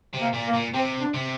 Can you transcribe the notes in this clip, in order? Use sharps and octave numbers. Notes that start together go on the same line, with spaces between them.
C3
A#3
A#2
A#3
A#2
C3 C4
D4
C3